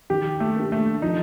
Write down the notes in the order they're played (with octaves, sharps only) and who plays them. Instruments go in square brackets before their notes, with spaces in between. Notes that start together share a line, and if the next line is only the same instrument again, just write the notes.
[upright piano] D#3 [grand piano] G4
[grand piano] A3
[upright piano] A#3 D4 G4
[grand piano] A3
[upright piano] F3 [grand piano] D#4